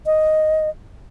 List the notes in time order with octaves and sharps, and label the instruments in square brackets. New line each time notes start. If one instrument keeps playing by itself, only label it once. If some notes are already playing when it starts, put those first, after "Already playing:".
[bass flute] D#5